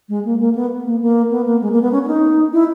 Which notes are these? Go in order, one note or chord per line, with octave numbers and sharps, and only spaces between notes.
G#3
A#3
A#3
B3
A#3
A#3
B3
A#3
G#3
A#3
B3
C#4
C#4
D#4
E4